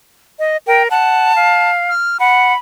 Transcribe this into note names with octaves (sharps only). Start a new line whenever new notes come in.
D#5
A#4 G5
F#5 A5
F5
F6
F#5 B5